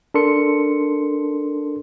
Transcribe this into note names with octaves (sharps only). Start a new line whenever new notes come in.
D4 A4 A#4 C6 C#7